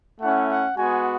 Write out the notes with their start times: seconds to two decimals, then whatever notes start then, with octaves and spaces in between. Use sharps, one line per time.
0.21 A3 C#4 E4 F#5
0.49 F#5
0.77 G#3 B3 F#4 G#5